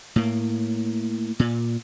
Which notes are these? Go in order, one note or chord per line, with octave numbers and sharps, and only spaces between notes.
A2 A#3
A#2